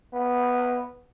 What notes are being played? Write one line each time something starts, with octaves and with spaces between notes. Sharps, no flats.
B3